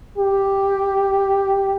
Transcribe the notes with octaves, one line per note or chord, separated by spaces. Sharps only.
G4